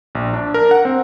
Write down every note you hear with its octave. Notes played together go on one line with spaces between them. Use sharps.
A#1
D4
A#4
F#5
C4